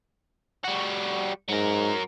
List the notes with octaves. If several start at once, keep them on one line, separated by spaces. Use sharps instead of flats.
G3 F#4
G#2 F#3 A#4